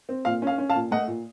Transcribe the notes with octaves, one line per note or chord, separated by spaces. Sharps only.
C4
A#2 F5
C#4 F5
C#4
F5 A5
A#2
A3 D#5 F#5
A#2